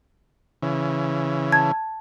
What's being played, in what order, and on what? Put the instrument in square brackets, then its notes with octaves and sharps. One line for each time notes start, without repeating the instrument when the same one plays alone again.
[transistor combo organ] C#3 E3
[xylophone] A5 G#6